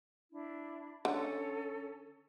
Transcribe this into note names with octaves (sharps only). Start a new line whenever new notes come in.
D4 E4
D3 C#4 A4